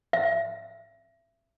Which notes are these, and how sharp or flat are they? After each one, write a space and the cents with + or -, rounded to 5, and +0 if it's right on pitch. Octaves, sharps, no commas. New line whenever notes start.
E5 +30